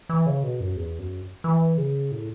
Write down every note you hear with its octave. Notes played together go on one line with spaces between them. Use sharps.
E3
C#3
B2
F#2
E2
F#2
E3
C#3
A2